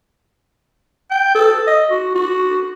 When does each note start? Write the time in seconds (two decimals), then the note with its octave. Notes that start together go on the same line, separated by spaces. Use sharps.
1.11 G5
1.35 A4
1.67 D#5
1.90 F#4
2.15 F#4